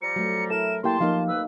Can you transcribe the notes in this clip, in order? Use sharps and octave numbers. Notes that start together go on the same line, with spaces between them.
F3 G3 A#5 C#7
F#3 A3
E4 A4 A#4 E7
A#3 E4 G4 G5 A5 C6
F3 A#3 D#4 F5
C2 B4 E6